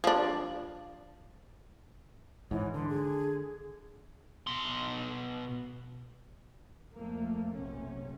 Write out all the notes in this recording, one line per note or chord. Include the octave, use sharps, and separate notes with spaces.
F3 D4
G#2 E3 C#5
D3 C6
G#4
B2 C6
F2 A3 A#3
B1 F#2 C3 C#4